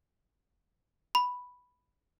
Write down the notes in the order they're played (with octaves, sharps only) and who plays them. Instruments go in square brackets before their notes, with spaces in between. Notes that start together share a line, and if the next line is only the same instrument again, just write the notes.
[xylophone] B5